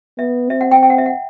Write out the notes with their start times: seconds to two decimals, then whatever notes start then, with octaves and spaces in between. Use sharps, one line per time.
0.18 B3 E5
0.50 C4 E5
0.61 F#5
0.71 G5
0.83 G5
0.90 F#5
0.98 E5
1.06 F#5